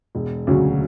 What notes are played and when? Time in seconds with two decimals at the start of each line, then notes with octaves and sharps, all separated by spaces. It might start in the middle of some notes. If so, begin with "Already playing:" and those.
0.15 E1
0.47 D2 C#3 F#3 C#4